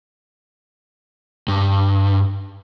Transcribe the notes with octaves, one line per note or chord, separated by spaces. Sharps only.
G2